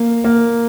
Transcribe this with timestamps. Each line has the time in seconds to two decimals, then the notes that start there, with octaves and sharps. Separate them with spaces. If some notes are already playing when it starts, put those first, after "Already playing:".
Already playing: A#3
0.24 A#3